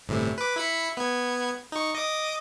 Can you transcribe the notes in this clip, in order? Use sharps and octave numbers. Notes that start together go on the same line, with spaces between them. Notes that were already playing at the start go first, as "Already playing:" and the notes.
G1 A2 C3
B4 D6
E4 B5 C#7
B3 G#6
D#4 C#6
D#5 D6 D#6